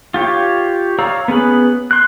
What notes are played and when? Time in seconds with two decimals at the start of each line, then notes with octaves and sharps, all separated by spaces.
0.14 F4 G4 C#5
0.99 C#5 D5 F5 A#5 E6
1.28 B3 C#4 G#4 B4
1.91 C6 F#6